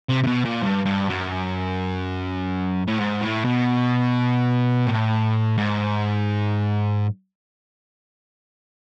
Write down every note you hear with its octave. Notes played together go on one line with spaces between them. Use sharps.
C3
C3
B2
A#2
G2
G2
F#2
A2
G#2
A2
B2
A2
G#2